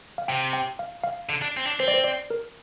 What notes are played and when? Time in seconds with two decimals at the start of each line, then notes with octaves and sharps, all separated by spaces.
0.18 F5
0.28 C3 G5
0.53 G5
0.79 F5
1.04 F5
1.29 D3
1.42 D4
1.57 C4
1.67 D4
1.80 C4 C5
1.88 D5
1.94 C5
2.04 D5
2.30 A#4